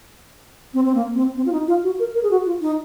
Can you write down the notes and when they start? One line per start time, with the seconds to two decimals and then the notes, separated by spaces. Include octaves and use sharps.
0.74 C4
0.85 C4
0.95 A#3
1.15 C4
1.36 C4
1.46 F4
1.52 D#4
1.68 F4
1.83 F#4
2.00 A#4
2.15 A#4
2.23 G#4
2.31 F#4
2.46 F4
2.61 D#4